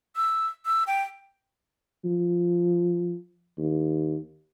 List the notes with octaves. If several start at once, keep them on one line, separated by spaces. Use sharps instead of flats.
E6
E6
G5
F3
D#2